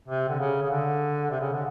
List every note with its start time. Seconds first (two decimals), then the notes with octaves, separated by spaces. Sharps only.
0.08 C3
0.29 D3
0.40 C#3
0.63 C#3
0.71 D3
1.31 C3
1.41 C#3
1.53 D3